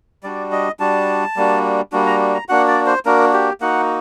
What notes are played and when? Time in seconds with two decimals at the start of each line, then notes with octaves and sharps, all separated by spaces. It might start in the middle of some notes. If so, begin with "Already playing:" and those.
0.23 G3 D4 F#4 D5
0.52 D#5
0.80 G3 D4 F#4 A5
1.36 G3 A#3 D4 F#4
1.92 G3 A#3 D4 F#4
2.06 A#5
2.34 A#5
2.49 A#3 D4 F#4 F#5
2.67 D5
2.86 C5
3.06 A#3 D4 F#4 A#4
3.33 G4
3.61 A#3 D#4 F#4 F#5